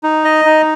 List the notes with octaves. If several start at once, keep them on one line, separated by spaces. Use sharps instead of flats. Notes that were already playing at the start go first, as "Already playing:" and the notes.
D#4
D#5
D#4